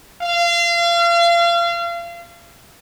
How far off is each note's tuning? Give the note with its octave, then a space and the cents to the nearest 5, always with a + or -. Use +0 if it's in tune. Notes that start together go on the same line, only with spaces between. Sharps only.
F5 -30